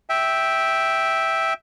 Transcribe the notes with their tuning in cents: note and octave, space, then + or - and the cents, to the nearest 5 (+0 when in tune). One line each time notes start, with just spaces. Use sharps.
E5 -10 G5 +0